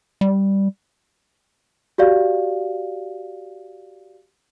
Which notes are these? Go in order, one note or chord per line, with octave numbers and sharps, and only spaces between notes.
G3
F#4 G4 D5 F5